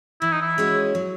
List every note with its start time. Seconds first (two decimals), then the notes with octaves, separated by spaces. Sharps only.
0.21 E3 E4
0.32 D#4
0.42 E4
0.58 G#3 C#4 F#4 C#5
0.95 F#3